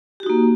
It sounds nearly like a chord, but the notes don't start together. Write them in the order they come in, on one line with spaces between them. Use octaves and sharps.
G4 F#4 D#4 A#3